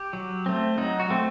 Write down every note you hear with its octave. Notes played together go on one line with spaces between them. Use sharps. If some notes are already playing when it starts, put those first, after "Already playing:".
Already playing: G4
F#3
A3 C4
F#3 D#4
F#4
A3 C4